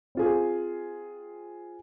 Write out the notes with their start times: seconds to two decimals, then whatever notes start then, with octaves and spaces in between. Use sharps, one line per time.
0.15 C4 F4 G#4